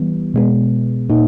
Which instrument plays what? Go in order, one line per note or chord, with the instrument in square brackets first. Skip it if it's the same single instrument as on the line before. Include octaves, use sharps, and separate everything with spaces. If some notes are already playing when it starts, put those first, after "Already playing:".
Already playing: [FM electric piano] E3 G3 B3
B2 G#3 B3
A#2 A#3 D#4